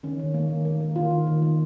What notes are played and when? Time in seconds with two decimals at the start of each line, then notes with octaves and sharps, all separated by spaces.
0.03 D#3 C#4
0.19 D#3
0.34 A#3
0.50 D#3
0.65 A#3
0.81 A#3
0.96 D#3 F4
1.11 D#3
1.27 D#3
1.42 A#3